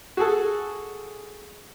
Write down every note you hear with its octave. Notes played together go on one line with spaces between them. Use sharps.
F#4 G#4 A4